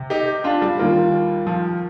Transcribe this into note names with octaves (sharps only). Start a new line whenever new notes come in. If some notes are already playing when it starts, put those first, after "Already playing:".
Already playing: C3
D#4 G4
D4 F4
G3
D#2 D#3 A#3 F4 A#4
F3